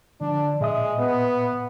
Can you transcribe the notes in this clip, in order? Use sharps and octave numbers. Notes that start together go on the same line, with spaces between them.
D3 F3 D4
A#2 G#3 E5 D#6
B3